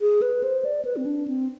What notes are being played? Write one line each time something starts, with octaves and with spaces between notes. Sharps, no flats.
G#4
B4
C5
D5
B4
C4
D4
C4